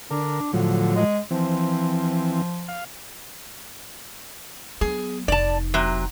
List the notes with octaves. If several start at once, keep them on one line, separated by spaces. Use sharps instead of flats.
D3 D4 A#4
A2 D3 F3 F#3
G#3
E3 F3 C4
F5
F#3 B3 G#4
F1 D#4 D5 A5
C3 F#3